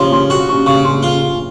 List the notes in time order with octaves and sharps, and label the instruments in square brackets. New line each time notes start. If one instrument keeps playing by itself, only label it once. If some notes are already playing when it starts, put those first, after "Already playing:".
Already playing: [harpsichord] C#3 F3 [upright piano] C#5 C6
[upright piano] C6
[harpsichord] F#4 [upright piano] C#6
[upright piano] C#6
[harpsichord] C#3 [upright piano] C#6
[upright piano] C6
[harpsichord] F4